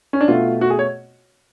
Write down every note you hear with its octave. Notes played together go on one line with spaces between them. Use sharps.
C#4
D4
B2 A3 F4
F#4
G#4
C#5